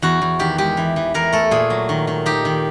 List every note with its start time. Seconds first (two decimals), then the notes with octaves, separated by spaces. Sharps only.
0.02 E2 F#4
0.22 E2
0.39 D#3 G4
0.58 G#3 G4
0.77 E3
0.96 E3
1.14 E3 A#4
1.33 A3 A4
1.51 A#2 G#4
1.70 F#3
1.89 D#3
2.07 D#3
2.26 D#4 G4
2.45 D#3